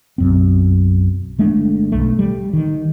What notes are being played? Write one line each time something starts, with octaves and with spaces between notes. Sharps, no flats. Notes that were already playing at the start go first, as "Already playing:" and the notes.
B1 F#2 C4
G1 G#3 A3 D4
B1 A3
G3
D#3